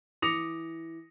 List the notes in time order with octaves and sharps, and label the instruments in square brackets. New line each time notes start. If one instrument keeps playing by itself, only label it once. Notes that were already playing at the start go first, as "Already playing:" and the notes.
[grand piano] E3 D6 D#6 A#6 C#7 F7